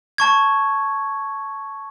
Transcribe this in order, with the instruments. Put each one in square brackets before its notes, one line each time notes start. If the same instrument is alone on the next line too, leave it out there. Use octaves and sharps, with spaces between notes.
[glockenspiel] A5 C#6 G#6